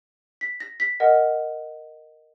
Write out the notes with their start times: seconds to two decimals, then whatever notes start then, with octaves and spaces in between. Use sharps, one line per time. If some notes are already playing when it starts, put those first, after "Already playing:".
0.41 B6
0.60 A#6
0.80 B6
1.00 A#4 D#5 F#5